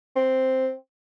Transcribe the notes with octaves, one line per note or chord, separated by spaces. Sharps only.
C4